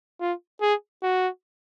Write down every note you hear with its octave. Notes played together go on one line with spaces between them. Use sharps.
F4
G#4
F#4